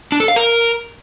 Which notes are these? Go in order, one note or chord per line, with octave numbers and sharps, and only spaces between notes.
D4
A4
F5
A#4